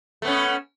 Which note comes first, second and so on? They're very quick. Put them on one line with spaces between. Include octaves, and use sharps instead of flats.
A3 B3 C#4